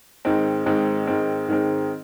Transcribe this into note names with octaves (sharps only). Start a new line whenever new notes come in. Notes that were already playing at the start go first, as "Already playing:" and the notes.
G#2 D#3 G#3 C4
G#2 D#3 G#3 C4
G#2 D#3 G#3 C4
G#2 D#3 G#3 C4